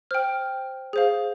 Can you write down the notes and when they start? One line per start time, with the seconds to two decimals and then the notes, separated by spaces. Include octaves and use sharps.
0.11 C5 G5 F6
0.93 G#4 C5 F5